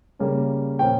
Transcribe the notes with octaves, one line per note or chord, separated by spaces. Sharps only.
C#3 G3 A#3 C#4
A#2 F3 A#3 C#4 G5